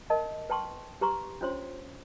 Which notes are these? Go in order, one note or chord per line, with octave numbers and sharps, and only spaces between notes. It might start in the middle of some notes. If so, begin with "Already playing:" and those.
A#4 D#5 E5 A5
B4 G5 A5 C6 C#6
G4 B4 A#5 C6 C#6
C#4 D4 F4 C5 C#5 C6